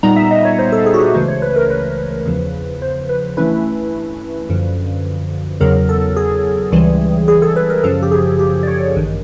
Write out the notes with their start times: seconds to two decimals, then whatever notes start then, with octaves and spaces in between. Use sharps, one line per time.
0.03 A#2 G3 B3 D#4 A#5
0.16 E5
0.31 D#5
0.45 C#5
0.59 C5
0.72 A4
0.86 G#4
0.94 F#4
1.00 G4
1.15 C#2 C#3 E3 A3 C5
1.28 C#5
1.42 B4
1.56 A#4
1.70 B4
2.26 E2 C#3 F3
2.82 C5
3.09 B4
3.37 G2 E3 A3 C#4 E4 B4
4.49 F#2 D3 F3
5.61 E2 C#3 F#3 A#4
5.89 A4
6.16 G#4
6.72 C#2 C#3 E3 G3
7.28 G#4
7.42 A4
7.56 B4
7.70 A#4
7.84 F#2 C#3 F3 A4
8.03 G4
8.11 G#4
8.39 G4
8.63 D5
8.68 C#5
8.96 A1 G2 D#3